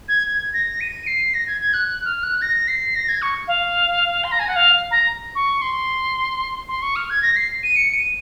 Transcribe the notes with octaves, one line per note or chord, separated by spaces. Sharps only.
G#6
G#6
A#6
D#7
C7
A#6
G#6
G#6
F#6
F#6
F6
F#6
A#6
C7
A#6
G#6
C#6
F5
C6
A#5
G#5
F#5
F5
A#5
C#6
C6
C6
C#6
F6
G#6
A#6
C7
D#7
C#7
D#7